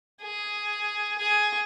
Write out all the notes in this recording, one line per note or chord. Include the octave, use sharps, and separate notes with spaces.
G#4
G#4